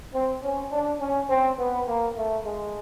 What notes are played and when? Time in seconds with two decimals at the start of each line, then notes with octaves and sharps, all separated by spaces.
0.14 C4
0.43 C#4
0.72 D4
1.00 C#4
1.30 C4
1.59 B3
1.88 A#3
2.17 A3
2.45 G#3